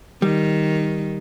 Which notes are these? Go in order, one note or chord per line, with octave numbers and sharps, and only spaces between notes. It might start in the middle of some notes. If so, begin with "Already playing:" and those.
D#3 G3